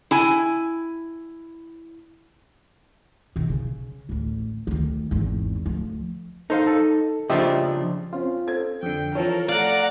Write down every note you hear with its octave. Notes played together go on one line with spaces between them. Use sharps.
E4 G#5
B2 D#3
C#3
A1 D2
D2 D#3
G#1 E2
D2 F3
D#4 A4 C5 F5
A4
C#3 F3 D4 G4 D#5 E5
C4 C#4 F4 C5
A4 C5 G#6
F2 D3 G5
E3 F3 F4 A4 A#4 C#5
A3 D5 F5 F#5 A#5 F#6